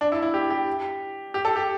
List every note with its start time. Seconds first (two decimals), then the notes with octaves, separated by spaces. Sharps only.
0.01 D4
0.12 E4
0.23 E4
0.34 G4
0.50 G4
1.34 G4
1.45 A4
1.56 G4